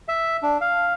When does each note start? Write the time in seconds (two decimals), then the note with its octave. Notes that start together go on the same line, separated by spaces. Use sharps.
0.08 E5
0.43 D4
0.61 F5